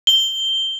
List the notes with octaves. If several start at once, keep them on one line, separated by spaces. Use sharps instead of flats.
G7